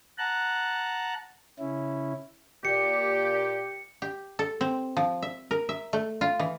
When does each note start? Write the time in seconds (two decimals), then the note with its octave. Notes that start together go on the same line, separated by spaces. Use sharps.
0.18 F#5 A5 A#5 F#6
1.59 C#3 C#4 E4
2.65 A#2 G4 D5 C#7
4.02 G4
4.39 A4
4.61 C4
4.97 F3
5.22 E5
5.51 A#4
5.69 E5
5.93 A3
6.21 F4
6.39 E3